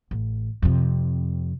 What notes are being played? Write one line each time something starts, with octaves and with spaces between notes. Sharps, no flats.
A1
F2 C3